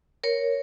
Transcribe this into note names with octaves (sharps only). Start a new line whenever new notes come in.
A#4 C#5